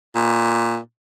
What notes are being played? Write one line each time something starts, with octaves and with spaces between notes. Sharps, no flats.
A#2